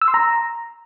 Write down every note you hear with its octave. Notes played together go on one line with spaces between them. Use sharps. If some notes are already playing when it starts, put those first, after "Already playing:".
E6
C6
A#5